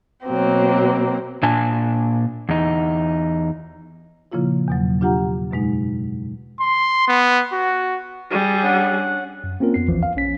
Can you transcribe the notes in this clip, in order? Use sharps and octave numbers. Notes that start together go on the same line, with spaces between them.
B2 F#3 A#3 C4
A#2 D4 G#5 A5
E2 D#4
A#2 C#3 F3 A#3 E4 F4
E2 B2 F#3
D4 F4 G4 F#5 A#5
F#2 B2 G#3 D#4
C6
B3
F#4
G3 G#4
C#4 D4 F#5
F#2
A#3 C4 C#4 F4 A#4
F2 B3 C7
A#1 E2 E3 F3
F5
A#1 C#4 B6